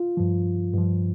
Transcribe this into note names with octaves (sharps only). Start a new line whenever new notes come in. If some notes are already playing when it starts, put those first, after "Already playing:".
Already playing: F4
G2 F3
G2 F3